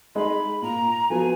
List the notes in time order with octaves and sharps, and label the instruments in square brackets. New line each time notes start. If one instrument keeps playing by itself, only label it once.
[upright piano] G#3 D#4 G#4 [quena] B5
[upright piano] A#2 [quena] A#5
[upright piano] F3 B3 F#4 [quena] G#5